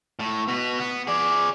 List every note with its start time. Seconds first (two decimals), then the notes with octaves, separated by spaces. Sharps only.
0.19 A2
0.48 B2 B3
0.80 B3
1.07 G#4 D5